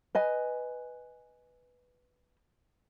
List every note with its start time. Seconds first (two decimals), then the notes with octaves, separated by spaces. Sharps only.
0.15 B4 D#5 G#5